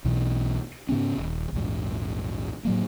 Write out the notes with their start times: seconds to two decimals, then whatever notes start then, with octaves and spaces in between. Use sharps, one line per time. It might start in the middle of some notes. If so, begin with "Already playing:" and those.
0.05 B1 B2 E3
0.89 G#2 C#3 B3 C#4
1.18 D#1
1.53 A#1 E2 G#2
2.65 A2 F#3 A#3